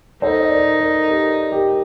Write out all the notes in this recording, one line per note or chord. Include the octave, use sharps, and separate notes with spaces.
D#4 A4 C5
D#5
A#4 D5
A#4 D5
G4 A#4
G4 A#4